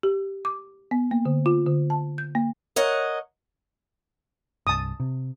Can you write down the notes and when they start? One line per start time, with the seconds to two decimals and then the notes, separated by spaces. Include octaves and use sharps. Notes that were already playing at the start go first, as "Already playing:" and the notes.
0.03 G4
0.45 D6
0.91 B3
1.11 A#3
1.25 D3
1.46 F4
1.67 D3
1.90 A5
2.18 G6
2.35 A#3
2.76 A#4 C#5 D#5 F#5
4.67 C2 G2 A5 D#6
5.00 C3